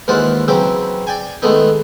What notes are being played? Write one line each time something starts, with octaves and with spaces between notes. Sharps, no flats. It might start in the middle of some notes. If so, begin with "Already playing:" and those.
D#2 E3 G#3 F4 C5 F#5
C#3 E3 F#3 C4 G5 D6
D5 G5 G#5
D#3 G#3 A3 B3 D#4